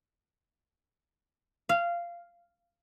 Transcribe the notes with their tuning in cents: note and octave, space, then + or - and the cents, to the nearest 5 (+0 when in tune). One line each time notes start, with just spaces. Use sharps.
F5 -15